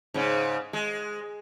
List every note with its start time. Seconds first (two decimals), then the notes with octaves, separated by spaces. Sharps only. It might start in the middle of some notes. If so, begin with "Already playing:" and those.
0.14 G#2 C#3
0.73 G#3